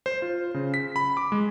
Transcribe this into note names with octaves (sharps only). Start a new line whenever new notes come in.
C5
F4
C#3
B6
B5
D6
G#3